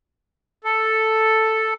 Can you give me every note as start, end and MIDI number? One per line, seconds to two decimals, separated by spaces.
0.64 1.74 69